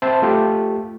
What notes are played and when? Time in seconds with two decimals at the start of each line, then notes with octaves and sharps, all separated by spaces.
0.02 C4 C5 E5 A5 B5
0.22 A3 F4 G4